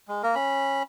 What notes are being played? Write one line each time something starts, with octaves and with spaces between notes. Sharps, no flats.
G#3
A#3 A#4
C#4 B5